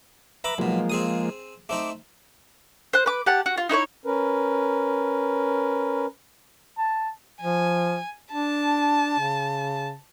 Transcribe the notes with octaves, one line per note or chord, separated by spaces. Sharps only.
B4 E5 A#5 B5 D6
B1 B2 F3 G#3 A#3
C4 G#4 D#6
A3 C4 D#4 D6
C5 F#6
B4 D6
G4 F#5 A5
F#4
F4
D#4 E4 C5 C#5
C#4 A#4 B4
A5
F3 G#5
D4 A5
C#3